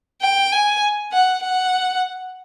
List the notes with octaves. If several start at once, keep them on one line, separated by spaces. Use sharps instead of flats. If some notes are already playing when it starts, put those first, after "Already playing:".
G5
G#5
F#5
F#5